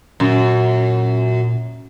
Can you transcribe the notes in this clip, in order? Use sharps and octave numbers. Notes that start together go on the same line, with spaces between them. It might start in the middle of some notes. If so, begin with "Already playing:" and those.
F#2 A#2